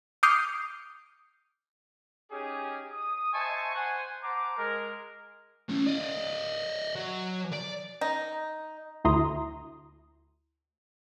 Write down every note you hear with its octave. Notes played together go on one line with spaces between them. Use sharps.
D6 D#6 F6 G6 C7 C#7
C#4 D#4 G4 G#4
D#6
C5 D#5 E5 G#5 A5 C#6
C5 F#5 G#5
C5 F#5 A5 A#5 D6
G#3 A#4
A3 C#4
D5 D#5
F#3
D5
D#4
D2 E4 A#5 C6 D#6